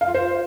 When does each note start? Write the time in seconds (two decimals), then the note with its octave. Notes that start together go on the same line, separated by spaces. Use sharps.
0.01 F5
0.08 F4
0.14 C5